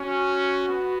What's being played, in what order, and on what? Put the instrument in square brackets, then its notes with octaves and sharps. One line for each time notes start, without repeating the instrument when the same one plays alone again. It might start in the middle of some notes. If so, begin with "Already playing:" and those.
Already playing: [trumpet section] C#4 [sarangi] F#4
[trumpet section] B3